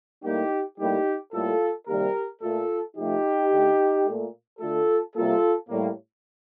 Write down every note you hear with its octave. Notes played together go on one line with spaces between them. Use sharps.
A2 G3 A#3 D#4 G4
A2 G3 A#3 D#4 G4
A2 G3 A#3 F4 A4
C3 D#3 G3 A#3 G4 A#4
A#2 A3 F4 A4
C3 F3 A3 D#4 G4
D3
A3
A#2 A3
D3 A3 F4 A4
C3 G3 A#3 F4 A4
A2 G3 A#3